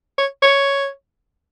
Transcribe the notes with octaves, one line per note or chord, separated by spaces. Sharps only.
C#5
C#5